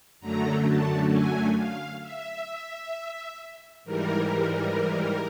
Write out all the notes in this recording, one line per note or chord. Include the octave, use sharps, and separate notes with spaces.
F#2 D3 F#3 A3 A#5
A5
G#5
F5
E5
G#2 E3 G3 A#4